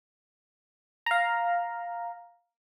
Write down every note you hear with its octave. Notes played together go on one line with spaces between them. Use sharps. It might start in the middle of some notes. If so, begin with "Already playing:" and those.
F5 A#5